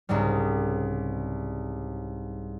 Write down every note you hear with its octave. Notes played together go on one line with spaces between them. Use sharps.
C2 G#2 C#3 G3